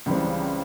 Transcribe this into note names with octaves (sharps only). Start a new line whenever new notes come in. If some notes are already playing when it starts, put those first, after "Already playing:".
C#2 C#3 E3 G3 C4